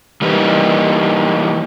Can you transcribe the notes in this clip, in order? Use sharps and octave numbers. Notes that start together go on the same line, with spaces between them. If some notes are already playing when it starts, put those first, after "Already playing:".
E3 G3 A#3 D#4 B4